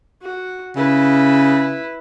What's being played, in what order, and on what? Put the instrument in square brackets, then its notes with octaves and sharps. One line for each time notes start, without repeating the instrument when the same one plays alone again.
[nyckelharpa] F#4
[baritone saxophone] C#3 [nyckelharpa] E4 B4